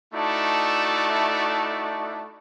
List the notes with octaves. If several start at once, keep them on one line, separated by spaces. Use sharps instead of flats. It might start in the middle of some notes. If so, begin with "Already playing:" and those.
A3 D#4 E4 F#4 D5 A5